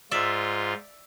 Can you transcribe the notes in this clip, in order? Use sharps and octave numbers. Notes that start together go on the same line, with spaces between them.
G#2 F4 D5 E5